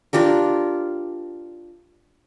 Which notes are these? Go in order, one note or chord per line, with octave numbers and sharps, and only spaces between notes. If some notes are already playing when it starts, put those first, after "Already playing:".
D4 F4 G4 A#4